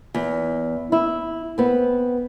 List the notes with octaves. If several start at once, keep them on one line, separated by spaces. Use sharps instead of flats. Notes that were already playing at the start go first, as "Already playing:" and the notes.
E2
E4
B3 C4